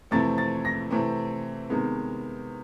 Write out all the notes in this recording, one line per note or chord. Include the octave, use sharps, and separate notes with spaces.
F2 C3 E3 A3 C4 A6
A6
A#6
C3 E3 A3 C4
C3 D#3 G#3 B3